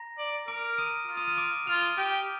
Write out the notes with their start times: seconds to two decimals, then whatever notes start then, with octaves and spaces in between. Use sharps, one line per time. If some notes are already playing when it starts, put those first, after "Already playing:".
Already playing: A#5 A#6
0.18 D5
0.48 A#4 D6 D7
0.78 D#6 D#7
1.07 F4
1.17 D#6 D#7
1.27 D#6 D#7
1.37 D6 D7
1.67 F4 F6 F7
1.82 D#6 D#7
1.97 G4 D6 D7